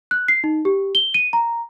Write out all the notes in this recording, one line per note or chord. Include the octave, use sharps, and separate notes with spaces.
F#6
C7
D#4
G4
G7
D#7
A#5